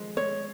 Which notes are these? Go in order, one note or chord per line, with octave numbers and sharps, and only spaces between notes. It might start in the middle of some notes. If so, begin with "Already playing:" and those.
Already playing: F3 G#3
G#3 C#5